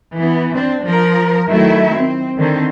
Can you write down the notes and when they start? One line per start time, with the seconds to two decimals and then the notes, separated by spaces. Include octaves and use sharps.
0.14 E3 B3
0.53 C4 D4
0.83 F3 A#4
1.47 D#3 F#3 A3 E4 E5
1.94 C4
2.37 D3 D#3 C4